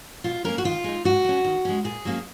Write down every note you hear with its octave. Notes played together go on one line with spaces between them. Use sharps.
B2 F4
A#3 C#4 A#4
F#4
D#3 F4
G#3 D#4
G#2 F#4
F#3 C#4
D#3
G#3 C#4
A#2 G#4
F#3 A#3 C#4